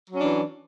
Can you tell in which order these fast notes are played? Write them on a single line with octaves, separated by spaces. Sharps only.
F#3 C#4 D4 E3